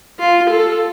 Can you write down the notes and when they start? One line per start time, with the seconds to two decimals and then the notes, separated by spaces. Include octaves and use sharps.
0.19 F4
0.50 A4